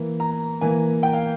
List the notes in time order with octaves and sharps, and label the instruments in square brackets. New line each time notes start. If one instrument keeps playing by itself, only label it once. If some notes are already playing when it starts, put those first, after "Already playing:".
Already playing: [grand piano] E3 A#3
A#5
E3 A#3 G#5
G5
F5